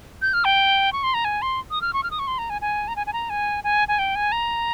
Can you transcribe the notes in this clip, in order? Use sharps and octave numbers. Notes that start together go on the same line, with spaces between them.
G6
F6
G5
C#6
C6
A#5
G#5
C6
D#6
F6
C#6
F6
D#6
C#6
C6
A#5
G#5
G#5
A#5
G#5
G#5
A#5
G#5
G#5
G#5
G5
G#5
A#5